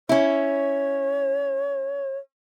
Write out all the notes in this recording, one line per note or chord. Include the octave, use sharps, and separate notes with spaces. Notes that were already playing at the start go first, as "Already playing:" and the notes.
C#4 E4 C#5